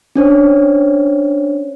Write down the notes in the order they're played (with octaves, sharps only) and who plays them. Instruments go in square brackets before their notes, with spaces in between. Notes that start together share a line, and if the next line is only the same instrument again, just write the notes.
[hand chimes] C#4 D4 C5 C#5